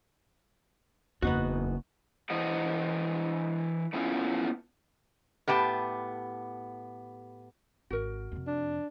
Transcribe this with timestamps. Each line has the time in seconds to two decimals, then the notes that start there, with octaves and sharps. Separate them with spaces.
1.22 F#1 E2 B3 D#4 F#4
2.30 E3 E4 C5 D#5 F#5
3.93 A3 B3 C#4 E4 F4
5.48 A2 B3 G4 A5
7.90 G#1 F#4 A#4
8.32 F2 C3
8.47 D4